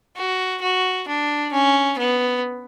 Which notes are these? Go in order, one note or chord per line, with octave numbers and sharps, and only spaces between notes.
F#4
F#4
D4
C#4
B3